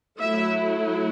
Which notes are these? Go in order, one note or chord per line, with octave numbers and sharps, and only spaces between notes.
F#3 A3 E4 E5